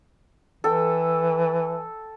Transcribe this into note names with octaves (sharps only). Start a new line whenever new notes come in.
E3 A4 G5